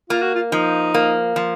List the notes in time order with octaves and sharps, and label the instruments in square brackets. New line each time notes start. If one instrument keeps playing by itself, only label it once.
[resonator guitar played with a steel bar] A#3 [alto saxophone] F4
[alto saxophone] F#4
F4
[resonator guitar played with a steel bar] F3 [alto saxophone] D#4
[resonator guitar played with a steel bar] A#3
F3